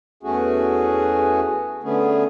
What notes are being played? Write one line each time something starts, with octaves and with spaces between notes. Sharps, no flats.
E2 A3 C#4 F#4 G#4
D3 A3 B3 C#4 G#4